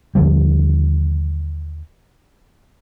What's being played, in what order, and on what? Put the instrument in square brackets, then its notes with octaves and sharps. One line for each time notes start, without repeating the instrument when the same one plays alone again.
[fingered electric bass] D#2 D3 F3 G3